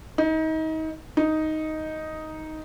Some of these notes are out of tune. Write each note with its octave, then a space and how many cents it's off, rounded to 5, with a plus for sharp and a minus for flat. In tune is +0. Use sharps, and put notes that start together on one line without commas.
D#4 +30
D#4 +5